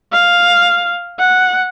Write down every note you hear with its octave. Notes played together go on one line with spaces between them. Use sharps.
F5
F#5